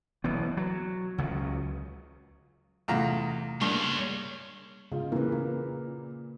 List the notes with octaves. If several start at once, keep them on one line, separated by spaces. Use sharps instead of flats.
B1 E3 B3
F#3
C#2 C#3 F#3
E2 C3 A3 F4 A#5
G2 G#3 A#3 C#5
G#2 C#3 F4
A#2 E3 A#4 B4
A#2 A#4